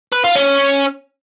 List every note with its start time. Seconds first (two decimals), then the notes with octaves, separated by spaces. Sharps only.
0.13 B4
0.24 F4
0.36 C#4